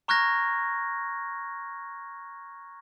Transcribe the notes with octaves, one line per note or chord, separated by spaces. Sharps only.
A#5 C#6 F6 F#6 G#6 A#6